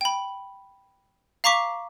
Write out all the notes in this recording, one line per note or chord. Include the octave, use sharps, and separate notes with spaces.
G5 B5
F5 A#5 C#6 D6 B6